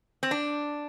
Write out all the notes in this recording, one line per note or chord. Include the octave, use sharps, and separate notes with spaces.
C4
D4